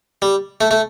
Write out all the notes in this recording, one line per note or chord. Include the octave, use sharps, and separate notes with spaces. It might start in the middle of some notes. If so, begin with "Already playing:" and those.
G3
A3
A3